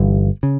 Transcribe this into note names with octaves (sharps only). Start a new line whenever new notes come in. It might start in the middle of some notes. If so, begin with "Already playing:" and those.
Already playing: G1 G2 E3
C#3